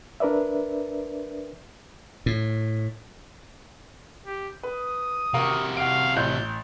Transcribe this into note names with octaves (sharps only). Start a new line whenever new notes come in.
D4 A#4 B4 D5 E5
A2
G4
B4 D#6
C3 F#4 A#4 F5
F5 F#5 D7
A1 F#6 G6